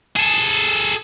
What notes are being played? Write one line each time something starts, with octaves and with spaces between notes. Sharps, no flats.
G#4 A4